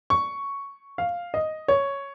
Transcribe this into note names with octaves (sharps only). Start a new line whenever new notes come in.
C#6
F5
D#5
C#5